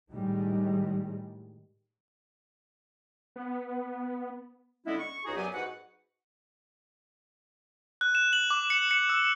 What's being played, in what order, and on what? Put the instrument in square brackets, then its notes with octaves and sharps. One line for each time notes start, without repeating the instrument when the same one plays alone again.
[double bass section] A2 D#3 G3 G#3
[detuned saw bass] B3
[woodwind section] D3 G#3 B3 C#4 E4
C#6
C#2 D#4 F#4 G#4
F#2 F#3 B3 G4 D5 G#5
G#2 F#4 B4 F#5
[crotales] F#6
E7
F#7
D6
C#7
C#7
E6